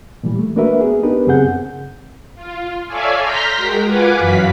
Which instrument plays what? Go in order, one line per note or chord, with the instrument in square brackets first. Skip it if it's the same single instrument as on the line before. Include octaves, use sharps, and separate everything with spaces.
[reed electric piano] A#2 E3 G3
A3
A#3 D4 F#4 A#4 B4 E5
B3 G#4
B3 D4 D#4 G4 A#4 B4
F#2 C#3 C4 G#4 F#5 G6
[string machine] F4
A4 C#5 D5 E5 F5 G#5
A#5 C6 F6 G6 A#6 B6
G#3 F#4 A#4 G5
F4 B4 F#5 G#5 D6
F#2 E3 F#4 F5 B6